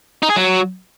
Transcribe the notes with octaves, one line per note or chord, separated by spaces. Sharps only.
D#4
G#4
F#3